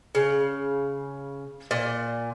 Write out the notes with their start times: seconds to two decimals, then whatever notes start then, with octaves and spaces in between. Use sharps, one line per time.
0.15 C#3
1.71 A#2